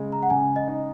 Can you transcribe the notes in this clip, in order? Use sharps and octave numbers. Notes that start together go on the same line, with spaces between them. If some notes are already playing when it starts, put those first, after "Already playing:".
Already playing: C#3 G#3
A#5
F#5
C#3 G#5
D#5
D#4